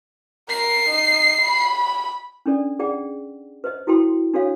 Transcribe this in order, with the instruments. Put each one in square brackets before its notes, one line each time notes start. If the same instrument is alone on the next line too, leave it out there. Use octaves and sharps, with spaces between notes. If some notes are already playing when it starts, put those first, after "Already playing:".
[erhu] A#4 [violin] C7
[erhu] D#4
B5
[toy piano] C#4 D4 A4 D5
G#4 D5 F#5 G5
B4 C5 D#5
E4 F#4 A4 G5 C6
D4 F#4 A4 C#5 F5